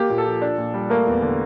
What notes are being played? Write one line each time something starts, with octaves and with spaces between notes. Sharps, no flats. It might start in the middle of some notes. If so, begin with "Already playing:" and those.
Already playing: A#3 G4
A#2
A4
F3
D4
A#2
G3
A3 A#3 A#4
E2
D3